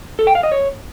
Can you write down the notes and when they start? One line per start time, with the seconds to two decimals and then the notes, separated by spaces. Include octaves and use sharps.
0.19 A4
0.27 G5
0.35 F5
0.43 D#5
0.52 C#5